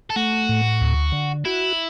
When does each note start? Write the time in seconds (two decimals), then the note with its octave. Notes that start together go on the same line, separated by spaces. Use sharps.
0.10 A4
0.16 A3 F#4
0.49 A2
0.81 D2
1.12 D3
1.45 E4 F#4